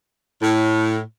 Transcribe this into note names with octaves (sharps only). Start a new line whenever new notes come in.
A2